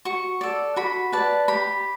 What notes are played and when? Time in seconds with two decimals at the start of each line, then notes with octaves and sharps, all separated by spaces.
0.05 F#4 C#6
0.41 A4 D5
0.76 F#4 B5
1.12 B4 D5 A5
1.48 G4 B5